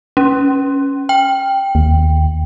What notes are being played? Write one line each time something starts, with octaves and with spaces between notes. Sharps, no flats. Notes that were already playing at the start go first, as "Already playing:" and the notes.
C#4
G5
D#2